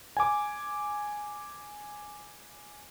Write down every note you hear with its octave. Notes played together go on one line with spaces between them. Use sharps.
G#5 D6